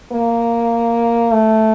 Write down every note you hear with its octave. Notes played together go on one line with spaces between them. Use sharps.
A#3
A3